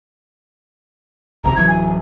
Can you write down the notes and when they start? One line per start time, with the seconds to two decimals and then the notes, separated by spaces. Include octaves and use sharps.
1.44 F1 D2 C3 A#5
1.56 D1 E3 F#3 G#6
1.68 G#5